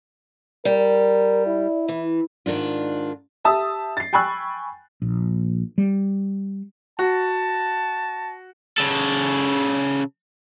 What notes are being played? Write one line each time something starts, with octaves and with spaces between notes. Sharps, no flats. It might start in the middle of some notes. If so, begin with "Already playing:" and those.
G3 A#4
E4
E3
G#2 D#3 D4 F4
G4 E5 A5 D#6 E6
A6 C7
G5 G#5 B5 C#6 E6 F#6
A#1
G3
F#4 A5
C#3 A4